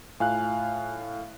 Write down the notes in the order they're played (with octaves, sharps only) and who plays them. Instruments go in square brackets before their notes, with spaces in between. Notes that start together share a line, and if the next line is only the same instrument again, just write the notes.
[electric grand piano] A2 F5 F#6 [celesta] F4 G#5